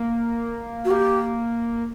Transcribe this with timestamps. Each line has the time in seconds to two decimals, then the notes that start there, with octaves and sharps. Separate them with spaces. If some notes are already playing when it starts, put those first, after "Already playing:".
Already playing: A#3
0.85 F#4
0.90 A#3 G4